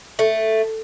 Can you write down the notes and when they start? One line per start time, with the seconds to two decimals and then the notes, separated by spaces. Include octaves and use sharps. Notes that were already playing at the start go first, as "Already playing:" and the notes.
0.19 A3